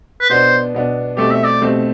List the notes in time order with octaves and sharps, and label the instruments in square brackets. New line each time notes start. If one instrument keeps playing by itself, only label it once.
[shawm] B4
[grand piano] B2 B3 D4 [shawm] C5
[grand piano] B2 B3 D4
[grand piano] B2 A3 C4 G4 [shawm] D5
[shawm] E5
D5
[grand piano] B2 A3 C4 G4